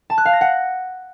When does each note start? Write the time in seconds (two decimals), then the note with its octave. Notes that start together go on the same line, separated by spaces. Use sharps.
0.10 A5
0.18 F#6
0.25 F5
0.33 A#6
0.41 F#5